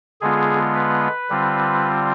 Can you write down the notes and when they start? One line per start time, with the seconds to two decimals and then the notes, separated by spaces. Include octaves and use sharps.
0.21 D3 G#3 B3 F4 G#4
0.75 B4
1.30 D3 G3 C4 F4